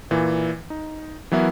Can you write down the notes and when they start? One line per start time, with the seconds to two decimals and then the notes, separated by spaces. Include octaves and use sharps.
0.11 A#2 E3
0.70 D#4
1.32 E3 F#3 B3 E4 A#4